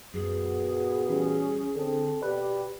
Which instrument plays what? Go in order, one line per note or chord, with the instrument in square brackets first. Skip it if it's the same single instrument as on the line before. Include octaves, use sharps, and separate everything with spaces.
[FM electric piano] F#2 [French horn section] A#2 B3 F#4 [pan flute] G#4
[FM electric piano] E3 G3 [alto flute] C#4
[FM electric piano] D3 [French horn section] C4 A4
[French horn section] B2 D5 [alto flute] G4 [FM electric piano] B4